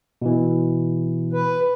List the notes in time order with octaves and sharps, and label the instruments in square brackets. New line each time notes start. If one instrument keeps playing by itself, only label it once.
[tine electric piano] B2 E3
[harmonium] B4